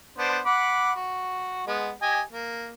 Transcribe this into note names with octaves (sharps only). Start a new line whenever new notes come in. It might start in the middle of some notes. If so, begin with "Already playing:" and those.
B3 D4 C5
F#5 B5 D6
F#4
G#3 B3
G4 D#5 G#5
A#3